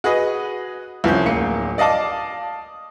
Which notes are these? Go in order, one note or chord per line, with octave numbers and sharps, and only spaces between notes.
F#4 G#4 B4 D#5
C2 F3 C#4 G6
D1 A#3 F4 C#7
D5 D#5 F5 A5 D6